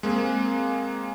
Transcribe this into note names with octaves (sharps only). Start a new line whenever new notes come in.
G#3 A#3 C4 G#4